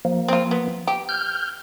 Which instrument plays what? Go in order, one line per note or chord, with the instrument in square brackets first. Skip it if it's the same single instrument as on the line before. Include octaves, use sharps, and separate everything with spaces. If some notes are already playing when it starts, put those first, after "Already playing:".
[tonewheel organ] F3 A#3
[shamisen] C4 F4
B3
G4
[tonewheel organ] F6 G6